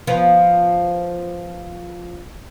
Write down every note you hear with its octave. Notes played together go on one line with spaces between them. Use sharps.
F3 B3